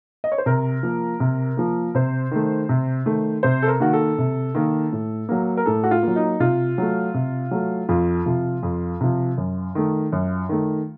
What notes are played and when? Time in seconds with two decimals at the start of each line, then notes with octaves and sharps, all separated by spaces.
0.24 D#5
0.32 C#5
0.38 C5
0.46 C3 A#4
0.83 F3 A#3
1.20 C3
1.57 F3 A#3
1.95 C3 C5
2.31 D#3 A3
2.69 C3
3.06 D#3 A3
3.43 C3 C5
3.62 A4
3.68 A#4
3.80 D#3 A#3 F#4
3.93 A4
4.18 C3
4.55 D#3 A#3
4.92 A2
5.29 F#3 A#3
5.57 A#4
5.66 A2 A4
5.84 F#4
5.91 F4
6.03 F#3 A#3
6.16 D#4
6.40 C3 F4
6.78 F#3 A3
7.14 C3
7.51 F#3 A3
7.89 F2 F4
8.26 C3 F3
8.63 F2
9.01 C3 F3
9.38 F#2
9.75 D#3 A3
10.12 F#2
10.49 D#3 A3